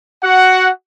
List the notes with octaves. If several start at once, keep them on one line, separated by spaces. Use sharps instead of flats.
F#4 F#5